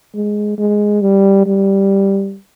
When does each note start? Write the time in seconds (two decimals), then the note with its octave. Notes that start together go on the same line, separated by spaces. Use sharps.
0.14 G#3
0.58 G#3
1.01 G3
1.46 G3